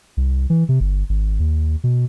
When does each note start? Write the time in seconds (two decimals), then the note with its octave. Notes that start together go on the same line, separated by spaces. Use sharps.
0.17 C2
0.50 E3
0.69 C3
0.80 G1
1.09 G#1
1.40 D#2
1.84 B2